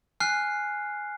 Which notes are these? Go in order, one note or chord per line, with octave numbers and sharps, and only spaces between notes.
G#5 F6 F#6 C7